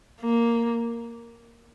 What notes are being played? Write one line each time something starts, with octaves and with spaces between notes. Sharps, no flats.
A#3